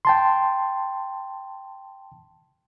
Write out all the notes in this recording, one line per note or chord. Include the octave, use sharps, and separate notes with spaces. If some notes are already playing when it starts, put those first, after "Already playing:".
G5 A5 C6